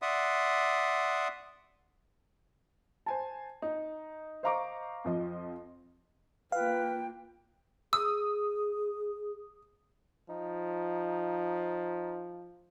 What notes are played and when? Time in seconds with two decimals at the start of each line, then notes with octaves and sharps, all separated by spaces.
0.02 D5 E5 F#5 C6 D#6
3.06 C5 G#5 A5
3.62 D#4
4.43 C5 D#5 F5 A#5 C#6 D6
5.04 F2 F3 D#5
6.52 A#3 F4 B4 F5 G5
7.93 G#4 D#6 E6
10.29 F3 D#4